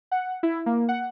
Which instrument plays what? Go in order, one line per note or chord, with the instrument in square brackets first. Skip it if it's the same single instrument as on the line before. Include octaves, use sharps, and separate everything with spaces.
[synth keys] F#5
E4
A#3
F#5